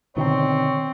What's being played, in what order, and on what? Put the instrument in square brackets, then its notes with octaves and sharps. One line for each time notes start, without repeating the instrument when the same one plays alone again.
[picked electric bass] B2 D3 D#3 [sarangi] C4 [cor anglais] C#5